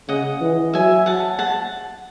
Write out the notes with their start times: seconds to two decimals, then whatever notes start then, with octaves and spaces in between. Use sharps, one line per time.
0.09 C#3 D#5 F#5
0.41 E3
0.73 F#3 E5 G#5
1.06 F#5 A5
1.39 F#5 A5